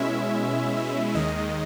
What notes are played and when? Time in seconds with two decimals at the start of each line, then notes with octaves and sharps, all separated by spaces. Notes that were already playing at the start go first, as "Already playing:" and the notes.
Already playing: B2 G#3 C#4 E4 E5
1.15 D#2 D#3 G#3 D#5